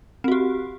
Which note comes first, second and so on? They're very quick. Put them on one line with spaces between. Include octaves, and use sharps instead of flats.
C4 F#4 G4